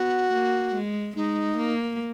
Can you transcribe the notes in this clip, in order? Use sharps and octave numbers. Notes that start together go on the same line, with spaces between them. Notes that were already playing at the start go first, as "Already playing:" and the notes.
Already playing: B3 F#4
A#3
G#3
G#3 D#4
A#3